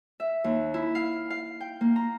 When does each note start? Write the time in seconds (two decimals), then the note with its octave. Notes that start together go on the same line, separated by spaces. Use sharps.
0.20 E5
0.44 D#2
0.74 E4
0.95 F5
1.30 F5
1.61 G5
1.81 A#3
1.96 A#5